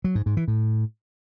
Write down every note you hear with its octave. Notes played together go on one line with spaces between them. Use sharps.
F#3
G#2
G#2
E3
A2